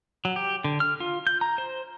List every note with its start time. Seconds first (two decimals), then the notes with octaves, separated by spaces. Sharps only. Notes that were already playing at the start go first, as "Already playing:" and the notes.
0.25 F#3
0.36 G4
0.64 D3
0.80 F6
1.00 F4
1.27 G6
1.41 A#5
1.58 C5